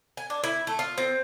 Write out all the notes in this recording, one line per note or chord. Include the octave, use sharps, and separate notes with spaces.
G#5
D4
E4
A3
F4
C4